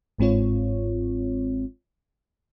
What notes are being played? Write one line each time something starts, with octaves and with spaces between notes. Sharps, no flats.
G1 G#2 C4 F4 C#5